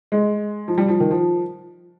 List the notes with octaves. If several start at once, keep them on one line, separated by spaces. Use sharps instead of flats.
G#3
F3
G3
F3
D#3
F3